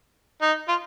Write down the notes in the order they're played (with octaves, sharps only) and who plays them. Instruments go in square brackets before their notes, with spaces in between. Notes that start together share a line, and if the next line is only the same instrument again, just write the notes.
[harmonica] D#4
F4